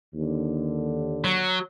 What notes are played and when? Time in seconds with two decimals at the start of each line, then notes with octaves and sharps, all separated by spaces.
0.14 D#2 D3
1.24 F#3